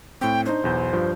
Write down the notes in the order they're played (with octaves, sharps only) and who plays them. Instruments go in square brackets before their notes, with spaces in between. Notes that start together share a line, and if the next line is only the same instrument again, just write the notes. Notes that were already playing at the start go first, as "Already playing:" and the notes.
[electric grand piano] A2 C4 [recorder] G5
[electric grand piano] D4 D#4 [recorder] C5
[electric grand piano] B1 E2 G6
G2 F3